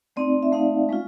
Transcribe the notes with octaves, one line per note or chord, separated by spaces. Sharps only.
A3 C4 D#4 D5
E5
A3 C4 D#4 F5
G#3 C#4 F4